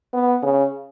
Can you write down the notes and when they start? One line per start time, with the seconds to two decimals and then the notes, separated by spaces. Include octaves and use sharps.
0.13 B3
0.43 C#3